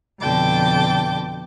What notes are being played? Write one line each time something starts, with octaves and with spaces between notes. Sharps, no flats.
F2 B2 D3 G5 A5 D6